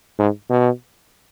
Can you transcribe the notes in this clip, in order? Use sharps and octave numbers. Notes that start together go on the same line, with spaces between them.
G#2
B2